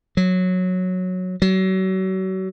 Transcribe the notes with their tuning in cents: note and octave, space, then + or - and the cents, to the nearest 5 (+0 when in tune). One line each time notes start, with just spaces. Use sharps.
F#3 -10
F#3 +35